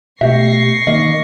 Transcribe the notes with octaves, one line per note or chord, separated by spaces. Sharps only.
B2 A3 G4 E5 C#6 A#6 C7
D#3 A#3 D#5